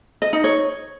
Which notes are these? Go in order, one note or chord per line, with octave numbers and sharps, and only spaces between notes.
D#5
D#4
C#5